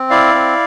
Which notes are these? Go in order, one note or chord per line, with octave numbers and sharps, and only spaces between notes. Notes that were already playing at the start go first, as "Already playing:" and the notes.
Already playing: C4
E4 D5 F5
C4